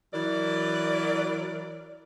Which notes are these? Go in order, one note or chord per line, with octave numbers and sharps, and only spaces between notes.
E3 F#3 A#4 D5